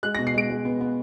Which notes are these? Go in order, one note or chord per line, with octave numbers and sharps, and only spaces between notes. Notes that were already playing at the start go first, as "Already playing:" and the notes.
G#3 F#6
A#6
B2
C7
G#3 D7
G#3
B3
B3